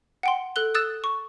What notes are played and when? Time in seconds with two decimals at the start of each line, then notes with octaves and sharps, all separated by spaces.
0.23 F#5 G5 C6
0.56 A4 F#6 G7
0.74 D#6 E6 F#6 A6 E7
1.04 C#6